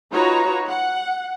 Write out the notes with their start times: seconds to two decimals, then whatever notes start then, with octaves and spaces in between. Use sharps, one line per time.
0.12 D#4 F4 F#4 B4 C#5 A#5
0.68 F#5